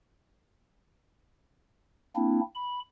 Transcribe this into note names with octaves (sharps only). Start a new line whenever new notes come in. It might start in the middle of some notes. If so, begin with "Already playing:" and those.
A#3 C4 D4 E4
B5